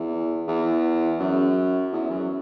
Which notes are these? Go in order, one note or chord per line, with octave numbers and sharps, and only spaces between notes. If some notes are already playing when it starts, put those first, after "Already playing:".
Already playing: E2
E2
F#2
E2
F#2